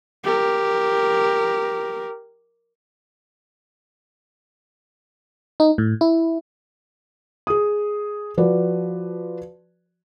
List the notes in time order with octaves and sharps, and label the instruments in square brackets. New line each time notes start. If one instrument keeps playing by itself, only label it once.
[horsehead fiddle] G4 A#4
[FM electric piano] D#4
A2
E4
[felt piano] G#4 D#6
F3 F#4 B4 D5